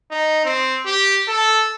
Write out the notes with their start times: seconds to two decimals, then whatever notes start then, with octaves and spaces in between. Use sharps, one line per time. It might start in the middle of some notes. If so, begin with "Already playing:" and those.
0.11 D#4
0.45 C4
0.86 G4
1.28 A4